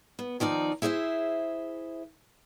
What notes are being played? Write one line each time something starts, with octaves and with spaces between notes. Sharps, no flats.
B3
D#3 F3 D#4 D5
E4 G#4 C5 D5 E5